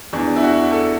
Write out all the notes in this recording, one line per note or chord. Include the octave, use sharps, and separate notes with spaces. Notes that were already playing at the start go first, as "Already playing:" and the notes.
E2 E3 D4
E4
F#4
A4